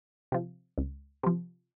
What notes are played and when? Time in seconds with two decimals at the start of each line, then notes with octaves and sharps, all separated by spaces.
0.32 C3 F3
0.78 C#2
1.23 C3 F3